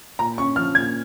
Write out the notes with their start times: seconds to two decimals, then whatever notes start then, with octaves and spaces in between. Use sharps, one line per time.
0.19 A#2 A#5
0.38 C#4 C#6
0.56 F3 F6
0.75 A#2 G#6